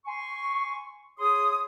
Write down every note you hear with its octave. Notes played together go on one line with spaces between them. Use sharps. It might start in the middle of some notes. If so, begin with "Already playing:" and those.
G#5 C6 C#6
G#4 C#5 C6 D#6